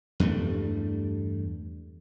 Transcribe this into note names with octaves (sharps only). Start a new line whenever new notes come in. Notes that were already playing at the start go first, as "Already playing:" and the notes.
E2 G2 G3 A3